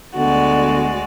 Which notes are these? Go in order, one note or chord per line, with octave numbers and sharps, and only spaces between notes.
D2 D3 G#3 B3 F#4 D5